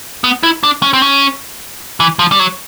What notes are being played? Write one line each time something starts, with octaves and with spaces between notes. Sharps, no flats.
B3
E4
D4
C#4
C4
C#4
E3
F3
G3
F#3